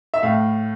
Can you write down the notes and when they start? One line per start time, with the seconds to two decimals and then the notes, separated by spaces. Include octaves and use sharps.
0.14 E5
0.22 A2 F5